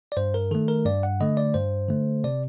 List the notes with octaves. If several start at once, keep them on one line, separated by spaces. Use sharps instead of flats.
D5
G2 C5
A#4
D#3 A3 A4
A#4
G2 D5
F#5
D3 A3 D#5
D5
G2 C5
D3 A3
C3 D5